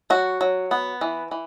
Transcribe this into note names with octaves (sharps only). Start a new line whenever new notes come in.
F#3 F#4
F#3
B3
E3
E3